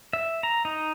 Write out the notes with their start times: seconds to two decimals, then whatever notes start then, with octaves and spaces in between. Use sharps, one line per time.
0.13 E5
0.43 A#5
0.65 D#4